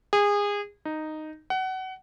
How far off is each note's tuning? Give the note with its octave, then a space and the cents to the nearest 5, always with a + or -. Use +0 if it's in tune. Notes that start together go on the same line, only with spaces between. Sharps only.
G#4 -25
D#4 -5
F#5 +25